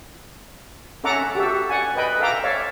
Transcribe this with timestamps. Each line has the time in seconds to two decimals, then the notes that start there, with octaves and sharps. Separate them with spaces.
1.04 C#4 A4 E5 F#5 A#5 D6
1.35 F#4 G4 A4 E5
1.69 D5 F#5 G#5
1.96 B4 D#5 G5 B5
2.19 A4 E5 F5 G5 A#5 D6
2.44 C#5 D5 E5 F5